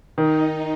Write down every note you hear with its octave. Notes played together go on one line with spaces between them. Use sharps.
D#3 D#4